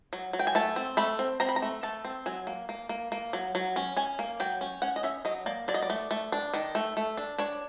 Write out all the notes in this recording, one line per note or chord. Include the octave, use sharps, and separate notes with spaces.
F#3
F#3
G5
G#5
A3 A5
C4
A3 B5
C4
C4 A#5
B5
A#5
A3
A3 A5
C4
F#3 G#5
A#3
A#3
A#3
A#3
F#3
F#3
C#4
C#4 G#5
A#3
F#3 G5
C#4
C#4 F#5
D#5
C#4 E5
F#3 D#5
A#3 D5
F#3 D5
D#5
D5
A3
A3
D4
D#3
A3
A3
D4
D4 C#5